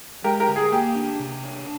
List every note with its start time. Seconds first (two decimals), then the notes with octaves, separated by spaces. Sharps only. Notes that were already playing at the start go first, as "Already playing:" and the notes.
0.24 G#3 G4 A#4
0.40 G4 A#4
0.48 D3
0.56 G#4
0.72 A#3 G4
0.95 D4
1.19 C3
1.44 D4